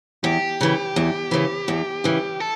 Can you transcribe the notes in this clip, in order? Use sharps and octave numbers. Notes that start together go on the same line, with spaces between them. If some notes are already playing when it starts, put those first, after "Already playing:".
E2 G4
C#3 E3
E2
C#3 E3
E2
C#3 E3
A4